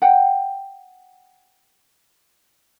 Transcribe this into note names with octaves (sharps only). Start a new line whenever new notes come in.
F#5 G5